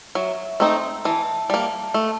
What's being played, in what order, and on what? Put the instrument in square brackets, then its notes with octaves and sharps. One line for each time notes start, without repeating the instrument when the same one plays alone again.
[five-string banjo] F#3 [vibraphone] E5
[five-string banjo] A3 C4 D#4
[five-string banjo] E3 [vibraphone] A5
[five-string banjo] G3 A#3
A3